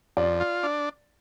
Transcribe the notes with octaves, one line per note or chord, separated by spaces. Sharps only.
F2 D5
F4
D4